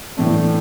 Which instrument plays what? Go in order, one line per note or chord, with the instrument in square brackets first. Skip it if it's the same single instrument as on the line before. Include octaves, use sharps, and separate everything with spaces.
[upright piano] A2 E3 A3 D4